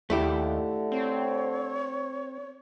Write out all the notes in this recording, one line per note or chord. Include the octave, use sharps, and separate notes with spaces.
D#2 D3 A3 E4 G4
C4 C#5